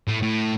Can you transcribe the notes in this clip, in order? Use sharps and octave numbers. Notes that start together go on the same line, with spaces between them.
A2
A2